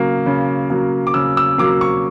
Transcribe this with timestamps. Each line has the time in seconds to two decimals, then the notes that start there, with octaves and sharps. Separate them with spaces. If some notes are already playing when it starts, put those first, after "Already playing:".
Already playing: C#3 F#3 A#3
0.26 C#3
0.70 F#3 A#3
1.07 D6
1.14 C#3 E6
1.37 E6
1.58 F#3 A#3 D6
1.81 C#6